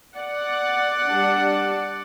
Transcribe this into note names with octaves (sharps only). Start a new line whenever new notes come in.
D5 F#5
G3 D4